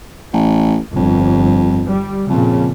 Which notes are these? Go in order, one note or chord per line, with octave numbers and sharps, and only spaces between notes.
A1
G1 F2
G3
F2 A#2 C#3